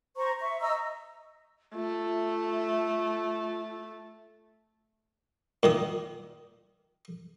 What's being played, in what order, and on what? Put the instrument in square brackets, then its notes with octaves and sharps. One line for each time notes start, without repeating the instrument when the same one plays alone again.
[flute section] C5 A#5 C#6
E5 C#6
D#5 A#5 E6
[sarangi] A3 [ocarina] F4
[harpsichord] A#2 D#3 D#6